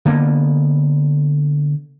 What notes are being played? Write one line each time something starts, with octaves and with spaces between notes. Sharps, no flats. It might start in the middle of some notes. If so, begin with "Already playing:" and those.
D3 A#3 B3